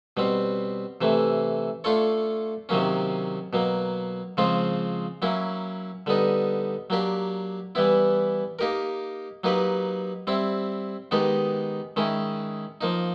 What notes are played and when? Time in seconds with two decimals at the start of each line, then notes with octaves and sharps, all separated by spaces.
0.17 B2 G3 C4
1.01 C3 E3 A3
1.84 A3 D4 F4 A4 C#5
2.69 C3 D#3 F#3 A#3 C#4
3.53 B2 F#3 A#3
4.37 C#3 F3 G#3 C4 F4
5.22 F#3 A#3 C#4 E4
6.06 D3 G3 B3 D#4
6.90 F#3 A#3 D4 G4
7.75 E3 G3 B3 E4
8.59 A#3 D#4 G4 A#4
9.44 F#3 A#3 D#4 G4 B4
10.27 G3 C4 E4
11.11 D#3 G#3 B3 D#4 G4
11.96 D#3 G#3 C#4 E4
12.81 F3 A#3 D#4